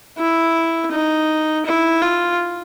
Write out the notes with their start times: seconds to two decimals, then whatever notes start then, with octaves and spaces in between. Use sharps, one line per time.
0.18 E4
0.91 D#4
1.65 E4
2.02 F4